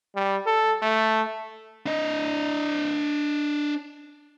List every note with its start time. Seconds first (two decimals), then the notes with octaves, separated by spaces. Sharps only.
0.15 G3
0.46 A4
0.82 A3
1.86 D4 D#5